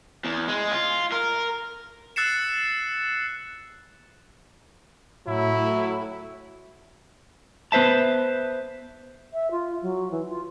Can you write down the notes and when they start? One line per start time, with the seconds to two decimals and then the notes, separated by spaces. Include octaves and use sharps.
0.24 E2
0.48 G#3
0.71 F4
1.12 A#4
2.16 E6 F#6 A6 C7 C#7 E7
5.27 A2 F#3 E4
7.72 B3 B4 C5 E5 A5
9.33 E5
9.51 F4
9.82 F#3
10.11 E3
10.29 F4